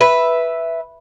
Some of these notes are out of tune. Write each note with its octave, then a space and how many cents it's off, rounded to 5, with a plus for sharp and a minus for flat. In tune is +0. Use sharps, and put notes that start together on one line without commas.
B4 +0 E5 +0